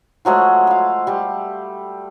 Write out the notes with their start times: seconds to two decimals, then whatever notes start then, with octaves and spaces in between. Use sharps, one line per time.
0.25 F3 F#3 G#3 A3
0.67 F5 B5
1.07 G3 A5